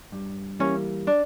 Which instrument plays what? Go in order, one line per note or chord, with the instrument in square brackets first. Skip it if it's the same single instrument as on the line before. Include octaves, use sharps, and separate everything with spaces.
[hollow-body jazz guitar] G2
[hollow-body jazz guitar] E3 G3 A#3 [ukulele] C#4
[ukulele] D4